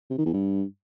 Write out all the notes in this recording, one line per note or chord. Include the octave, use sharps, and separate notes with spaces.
C3
D#3
E2
G2